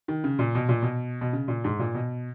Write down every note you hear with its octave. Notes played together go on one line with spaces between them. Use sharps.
D#3
C#3
A#2
B2
A#2
B2
B2
C#3
A#2
G#2
A#2
B2